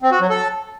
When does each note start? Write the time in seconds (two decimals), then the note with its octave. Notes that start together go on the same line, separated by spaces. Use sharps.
0.02 C4
0.11 F#4
0.20 F#3
0.29 A4